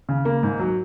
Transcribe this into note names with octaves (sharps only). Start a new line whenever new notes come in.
C#3
A#3
G#2
F#3